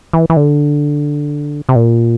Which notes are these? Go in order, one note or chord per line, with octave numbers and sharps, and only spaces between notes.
E3
E3
D3
C3
A#2